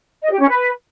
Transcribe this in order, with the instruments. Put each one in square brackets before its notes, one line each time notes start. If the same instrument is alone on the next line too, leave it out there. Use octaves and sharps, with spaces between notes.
[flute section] D#5
G4
C#4
B4